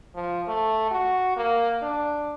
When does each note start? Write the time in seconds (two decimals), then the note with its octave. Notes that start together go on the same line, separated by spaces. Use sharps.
0.15 F3
0.48 A3
0.91 F#4
1.37 A#3
1.82 D4